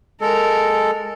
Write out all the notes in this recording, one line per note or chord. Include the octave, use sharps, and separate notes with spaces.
G#3 A4 A#4